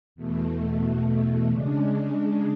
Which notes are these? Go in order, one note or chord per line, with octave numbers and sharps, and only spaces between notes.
E2 B2 A3
C#3 G#3 D4